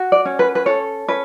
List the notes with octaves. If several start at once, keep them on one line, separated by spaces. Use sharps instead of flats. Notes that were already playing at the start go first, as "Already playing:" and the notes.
Already playing: F#4
D5
C#4
B4
B4
A4 C#5
C#4 B4